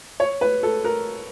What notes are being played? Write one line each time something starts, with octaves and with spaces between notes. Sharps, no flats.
C#5
B4
A4
A#4